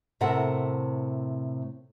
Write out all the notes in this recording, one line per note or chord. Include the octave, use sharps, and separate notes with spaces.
A2 C3 E4 A4 A#4 F#5